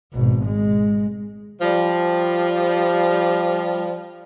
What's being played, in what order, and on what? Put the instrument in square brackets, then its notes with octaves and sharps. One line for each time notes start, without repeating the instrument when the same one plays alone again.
[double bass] G#1 B2
G#3
[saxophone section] F3 G3